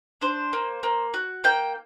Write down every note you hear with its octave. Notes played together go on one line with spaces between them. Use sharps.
D4 C5
A#3
A#3
F#4
A#3 G5